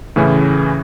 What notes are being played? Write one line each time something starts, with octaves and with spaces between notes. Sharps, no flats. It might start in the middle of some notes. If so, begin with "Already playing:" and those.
A2 C#3 E3 C#4